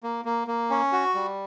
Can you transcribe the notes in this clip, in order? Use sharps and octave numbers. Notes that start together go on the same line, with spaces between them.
A#3
A#3
A#3
C#4
F#4
G3